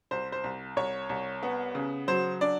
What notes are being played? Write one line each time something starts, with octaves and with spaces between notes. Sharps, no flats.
C2 C5
C5
C2
C2 C#5
C2
B3
C#3
F#3 C5
D4 D5